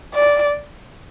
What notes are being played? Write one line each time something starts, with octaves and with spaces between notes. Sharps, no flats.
D5